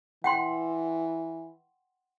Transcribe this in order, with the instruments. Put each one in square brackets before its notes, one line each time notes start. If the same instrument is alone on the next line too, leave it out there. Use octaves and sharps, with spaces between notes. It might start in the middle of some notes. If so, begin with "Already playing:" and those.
[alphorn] E3 [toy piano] F#5 G5 C6